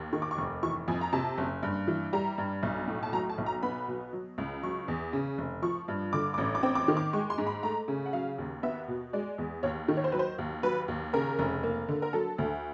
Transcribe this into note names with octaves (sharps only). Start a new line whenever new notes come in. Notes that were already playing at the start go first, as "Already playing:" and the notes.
Already playing: D#2
D#3 C#6
D6
C#6
F1
E3 C#6
F2 G#5
A#5
C3 A5
F#1
G2
E3
G3 A#5
G2
B1
A2
A5
F#3 A#5
A5
B1
A#5
B3 B5
B2
F#3
C#2
F#3 C#6
E2
C#3
F1
F3 C#6
G2
D3 D6
A1 D6
D6
C4
D6
D#3
D6
G#3 C#6
C6
G#2
B5
A3 A#5
C#3
F#5
F#3 F5
D#2
B3 E5
B2
G#3 D5
E2
D#2 C#5
D#3
C#5
C5
F#3 B4
C5
D#2
F#3 B4
D#2
C#3 A#4
F1
A#3
D3
A#4
F#3 A4
D2